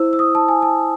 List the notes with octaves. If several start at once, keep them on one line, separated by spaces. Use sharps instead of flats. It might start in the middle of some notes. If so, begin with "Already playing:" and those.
Already playing: E4 C5 E6
E6
D#6
A5
G#5
A5